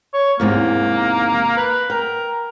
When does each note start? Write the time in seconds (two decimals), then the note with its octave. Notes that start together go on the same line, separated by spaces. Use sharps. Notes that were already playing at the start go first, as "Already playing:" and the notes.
0.14 C#5
0.40 E2 G#2 C3 A#3
1.57 B4
1.90 A#4 G5